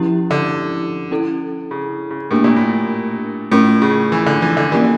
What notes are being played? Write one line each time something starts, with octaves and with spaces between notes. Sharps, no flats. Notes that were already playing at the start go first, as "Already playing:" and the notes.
Already playing: F3 C#4 E4 G4
D3
C#4 E4 A4
C#3
C#3
A2 A#3 D4 G4 A#4
A#2
A2
A2 A3 C#4 F4 A#4
C#3
E3
D3
E3
D3
E3 A#3 C#4 G4 A#4 D5